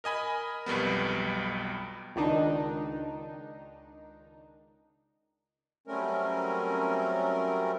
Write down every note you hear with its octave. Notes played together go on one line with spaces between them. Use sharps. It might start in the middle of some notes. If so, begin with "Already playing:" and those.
A#4 D#5 G#5 B5
B1 F2 G3 B3
C#2 D#3 D4 D#4
F#3 G3 A3 C4 C#4 A#4